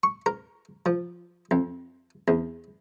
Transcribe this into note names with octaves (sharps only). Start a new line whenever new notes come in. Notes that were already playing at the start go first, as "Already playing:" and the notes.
C#6
A#4
F3
F2
E2